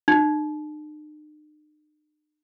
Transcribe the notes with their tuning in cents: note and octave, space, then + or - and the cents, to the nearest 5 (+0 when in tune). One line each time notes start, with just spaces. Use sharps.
D#4 -45